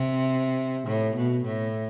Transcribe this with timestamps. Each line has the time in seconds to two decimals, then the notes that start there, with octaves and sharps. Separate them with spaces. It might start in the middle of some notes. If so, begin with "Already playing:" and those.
Already playing: C3
0.87 A2
1.16 B2
1.45 A2